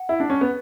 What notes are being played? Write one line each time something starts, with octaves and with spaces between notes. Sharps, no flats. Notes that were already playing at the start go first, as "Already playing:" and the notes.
Already playing: F#5
E4
D4
C#4
B3